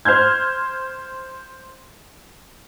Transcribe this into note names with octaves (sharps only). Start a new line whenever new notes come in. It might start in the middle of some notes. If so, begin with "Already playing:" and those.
C5 F6 G6 G#6